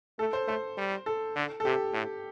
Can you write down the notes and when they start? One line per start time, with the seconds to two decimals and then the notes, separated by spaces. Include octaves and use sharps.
0.19 A3 A4
0.33 C5
0.47 A3 C5
0.77 G3
1.06 A4
1.36 D3
1.60 A4
1.65 C3 G4
1.93 A2